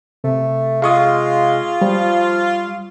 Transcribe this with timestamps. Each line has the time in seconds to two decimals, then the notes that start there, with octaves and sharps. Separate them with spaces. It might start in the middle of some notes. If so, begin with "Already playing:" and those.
0.24 C3 A3
0.82 G#3 F4 F5 C#6 D#6
1.81 F3 G3